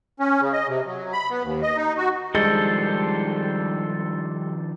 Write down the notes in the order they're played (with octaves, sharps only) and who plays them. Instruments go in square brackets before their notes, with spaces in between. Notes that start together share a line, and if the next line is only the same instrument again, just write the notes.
[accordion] C#4
C#3
D#5
C3
F#3
B5
B3
D#2
D#5
D#4
F#4
[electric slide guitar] D#3 F3 D4 [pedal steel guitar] G3 A4 C5 [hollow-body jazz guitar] G#3